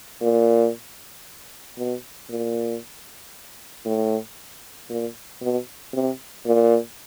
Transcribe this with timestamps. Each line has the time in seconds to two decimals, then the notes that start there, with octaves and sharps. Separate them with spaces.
0.22 A#2
1.78 B2
2.29 A#2
3.85 A2
4.90 A#2
5.42 B2
5.93 C3
6.46 A#2